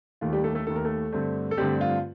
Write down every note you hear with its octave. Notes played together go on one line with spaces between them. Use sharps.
D#2 D#3 A3 F4
G3 G4
A3 A4
A3 A4
D#2 D#3 A3 A4
A#4
A3 A4
G2 D3 A3 C4
A4
G2 D3 G3 A3 C4 G4
F4